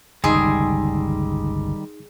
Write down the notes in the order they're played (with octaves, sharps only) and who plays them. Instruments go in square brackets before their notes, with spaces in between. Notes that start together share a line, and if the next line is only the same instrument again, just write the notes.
[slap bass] G1 C#2 [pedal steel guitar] D#3 G3 [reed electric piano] D#4 C6 E6 [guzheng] G#4